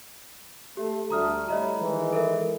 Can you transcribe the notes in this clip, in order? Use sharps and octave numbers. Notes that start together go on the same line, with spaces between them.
A3 G4
D2 G3 A3 A#5 D#6 F6
G3 A3 E4 C#5 D#5 A#5
D#3 E3 G#3
A4 A#4 E5